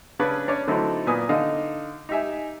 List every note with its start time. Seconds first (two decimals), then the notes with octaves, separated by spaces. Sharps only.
0.19 C#3 C#4 D4 B4
0.48 C#4 D4 C#5 D5
0.68 D3 F#3 A3 C4 D#4 E4
1.07 A#2 B3 G#5 D#6
1.29 D3 D#4 D#5 F5
2.09 D#4 G4 E5 G#5